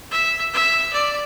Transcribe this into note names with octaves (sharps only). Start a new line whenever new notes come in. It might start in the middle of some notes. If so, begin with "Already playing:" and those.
E5
E5
D5